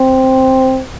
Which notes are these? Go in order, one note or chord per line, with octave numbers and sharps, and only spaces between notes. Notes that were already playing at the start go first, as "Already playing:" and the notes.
Already playing: C4